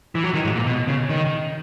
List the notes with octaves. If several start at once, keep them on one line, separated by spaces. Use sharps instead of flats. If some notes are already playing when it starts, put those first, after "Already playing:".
E3
F#3
D#3
G#2
A#2
B2
C#3
D#3